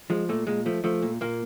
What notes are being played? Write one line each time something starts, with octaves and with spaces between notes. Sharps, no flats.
F3 G#3
A#2 A3
A#2 G#3
F3 A3
F3 A3
A#2
A#2 A#3